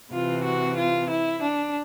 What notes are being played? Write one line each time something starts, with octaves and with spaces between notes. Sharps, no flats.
C3 E3 F4
F#4
F4
E4
D4